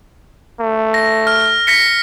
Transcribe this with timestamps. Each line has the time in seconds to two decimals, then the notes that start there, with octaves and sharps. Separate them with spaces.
0.60 A3
0.94 A#6
1.27 F6
1.67 A#6 B6 C#7